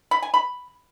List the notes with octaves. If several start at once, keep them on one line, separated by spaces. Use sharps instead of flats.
B5
G#5
B5